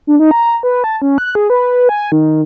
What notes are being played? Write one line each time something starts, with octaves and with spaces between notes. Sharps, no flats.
D4
D#4
A#5
B4
A5
C#4
F#6
G#4
B4
G#5
D#3